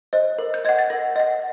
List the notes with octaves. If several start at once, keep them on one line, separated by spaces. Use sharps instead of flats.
C5 D#5
A#4
G6
D#5 F#5 G#6
A6
A#4 A#6
D#5 F#5